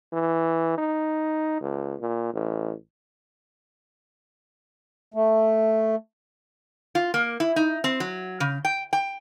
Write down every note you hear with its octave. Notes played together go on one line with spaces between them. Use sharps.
E3
D#4
C#2
A#2
A1
A3
F4
A#3
E4
D#4
C4
F#3
C#3
G5
G5